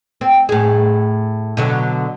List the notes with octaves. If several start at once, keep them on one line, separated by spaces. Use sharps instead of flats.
C4
A2 G#4
B2 D3 F#3